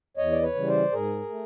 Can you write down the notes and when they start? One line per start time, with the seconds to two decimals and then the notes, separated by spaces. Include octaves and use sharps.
0.17 E2 C#5 D#5
0.32 D5
0.42 B4 C#5
0.55 C#3 E3 G3
0.68 C5 D5
0.92 G#2 G#4 A#4
1.30 A3